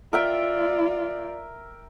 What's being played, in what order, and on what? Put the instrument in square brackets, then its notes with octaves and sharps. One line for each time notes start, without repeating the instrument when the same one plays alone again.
[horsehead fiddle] F4 D5 [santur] A#4 E5 G5